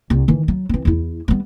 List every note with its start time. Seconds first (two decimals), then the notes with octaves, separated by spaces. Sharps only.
0.10 C2
0.28 D#3 E3
0.48 F#3
0.69 E3 C4
0.85 E2 E4
1.28 G3 B3